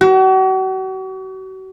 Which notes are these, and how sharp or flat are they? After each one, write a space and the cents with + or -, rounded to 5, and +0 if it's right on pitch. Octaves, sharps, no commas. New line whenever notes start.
F#4 +40